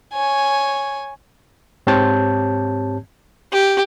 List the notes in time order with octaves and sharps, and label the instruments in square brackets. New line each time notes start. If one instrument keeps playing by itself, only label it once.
[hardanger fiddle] C#5 G#5
[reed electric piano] G#2 C4 G4 C#5 A5 G6
[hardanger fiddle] G4